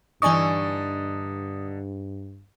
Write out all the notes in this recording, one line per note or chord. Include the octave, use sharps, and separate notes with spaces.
G2 D3 E3 D#4 D5 G#5 C#6 D#6